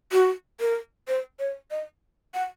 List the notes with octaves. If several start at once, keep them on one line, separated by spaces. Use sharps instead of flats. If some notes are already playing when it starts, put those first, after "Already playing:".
F#4
A#4
C5
C#5
D#5
F#5